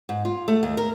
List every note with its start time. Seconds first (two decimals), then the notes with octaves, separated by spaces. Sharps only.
0.09 G#2
0.25 F4
0.48 A3
0.63 D#2
0.77 A#4